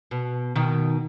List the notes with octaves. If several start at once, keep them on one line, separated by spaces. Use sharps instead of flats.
B2
B2 D#3